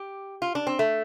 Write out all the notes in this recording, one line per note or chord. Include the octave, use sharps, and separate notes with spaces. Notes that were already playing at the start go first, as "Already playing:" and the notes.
Already playing: G4
F4
D4
C4
A3